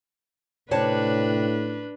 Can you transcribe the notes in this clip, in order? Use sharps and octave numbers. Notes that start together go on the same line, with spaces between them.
A2 C3 D4 B4 C#5 A5